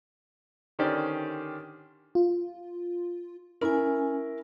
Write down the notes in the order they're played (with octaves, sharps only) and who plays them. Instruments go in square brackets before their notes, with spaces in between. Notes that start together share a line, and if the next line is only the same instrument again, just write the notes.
[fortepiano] D3 D#3 C#4 G4 C5 D5
[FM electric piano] F4
[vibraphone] C#4 G#5 [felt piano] E4 A#4